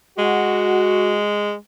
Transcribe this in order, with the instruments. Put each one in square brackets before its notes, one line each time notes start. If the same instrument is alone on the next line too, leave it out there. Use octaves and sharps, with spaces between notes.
[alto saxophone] G#3 [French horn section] F#4